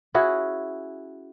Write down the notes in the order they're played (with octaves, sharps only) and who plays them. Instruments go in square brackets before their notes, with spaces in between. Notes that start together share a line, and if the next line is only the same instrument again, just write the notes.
[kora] C#4 E4 F#4 G#4